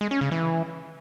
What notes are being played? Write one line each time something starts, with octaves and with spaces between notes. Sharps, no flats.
G#3
C#4
C#3
E3